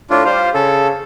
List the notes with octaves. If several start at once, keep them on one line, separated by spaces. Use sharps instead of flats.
A2 D4 F4
G3 F4 C5
C#3 A4